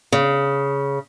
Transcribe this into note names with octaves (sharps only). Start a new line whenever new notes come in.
C#3